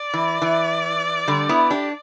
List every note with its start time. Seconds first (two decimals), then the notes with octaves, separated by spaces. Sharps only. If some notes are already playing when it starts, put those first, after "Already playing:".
Already playing: D5
0.14 E3
0.42 E3
1.28 D3 G3
1.49 B3 E4
1.70 D4 G4